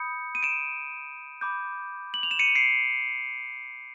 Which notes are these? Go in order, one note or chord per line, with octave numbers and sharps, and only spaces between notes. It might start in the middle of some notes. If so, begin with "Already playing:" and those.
Already playing: B5 D#6 G6 C#7
D#7
D7 E7
B5 D6 G6
F#7
F7
E7
C#7 D#7
C7 D7